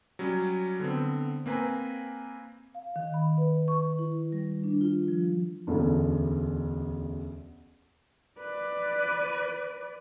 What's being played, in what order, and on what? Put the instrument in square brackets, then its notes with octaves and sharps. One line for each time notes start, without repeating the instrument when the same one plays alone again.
[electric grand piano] F#3 G3 C#4
D3 B3 C4
A#3 C4 B4 G#5 A#5
[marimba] F5
D#3
B5
B4
C#6
E4
G3
D4
F4
F3
[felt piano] E1 A1 D2
[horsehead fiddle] B4 D5